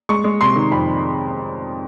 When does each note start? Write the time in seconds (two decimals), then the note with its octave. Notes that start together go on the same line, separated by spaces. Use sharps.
0.09 G#3 C#6
0.24 G#3
0.41 C3 C6
0.55 D#3
0.72 F2 B5